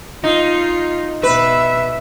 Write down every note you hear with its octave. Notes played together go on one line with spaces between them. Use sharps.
D#4 F4
B2 B4 E5